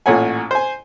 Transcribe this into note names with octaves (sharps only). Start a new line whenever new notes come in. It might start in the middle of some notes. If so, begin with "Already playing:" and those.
A1 A#2 A4 C#5 F#5 G#5
C5 G#5